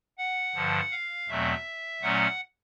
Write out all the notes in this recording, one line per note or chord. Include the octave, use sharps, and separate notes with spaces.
F#5
G2 D3 F3
F5
E2 B2 F#3 A3 C4 E5
A#2 F#3 A3 C#4 F#5